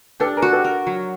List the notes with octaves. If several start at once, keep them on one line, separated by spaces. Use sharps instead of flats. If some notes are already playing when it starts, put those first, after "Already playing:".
D4 G4 A4
G#4 A#4
F#4
G4 A4
A#4
F#3